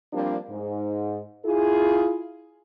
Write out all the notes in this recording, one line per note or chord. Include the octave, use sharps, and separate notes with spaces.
F3 G3 A#3 C4 D4
G#2
E4 F4 G#4